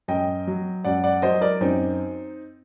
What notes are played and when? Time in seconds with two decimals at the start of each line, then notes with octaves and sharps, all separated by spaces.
0.08 F#2 D#5 G5
0.47 F#3
0.84 F#2 D5 F#5
1.04 D5 F#5
1.22 F#3 C5 D#5
1.41 A#4 D5
1.61 F#2 C4 D#4